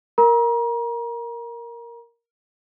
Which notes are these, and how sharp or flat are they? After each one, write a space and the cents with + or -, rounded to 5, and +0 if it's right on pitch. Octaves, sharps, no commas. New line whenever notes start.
A#4 +0 A#5 +35